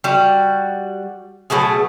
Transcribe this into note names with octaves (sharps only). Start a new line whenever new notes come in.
G3 F#4
B2 F#3 A3 G#4